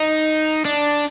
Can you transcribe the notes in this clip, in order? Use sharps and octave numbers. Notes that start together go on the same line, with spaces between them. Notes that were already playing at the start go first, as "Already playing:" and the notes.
Already playing: D#4
D4